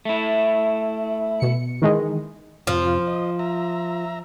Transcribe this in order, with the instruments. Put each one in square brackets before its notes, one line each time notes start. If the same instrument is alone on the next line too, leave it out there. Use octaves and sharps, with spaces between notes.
[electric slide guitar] A3 E4
[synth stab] B2 C#7
D#3 E3 G#3
[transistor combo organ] F2 C3 F4 [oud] F3
[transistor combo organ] D#5
E5 A#5